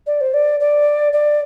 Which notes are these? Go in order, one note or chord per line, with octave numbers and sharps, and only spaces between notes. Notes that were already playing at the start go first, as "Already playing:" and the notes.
D5
C5
D5
D5
D5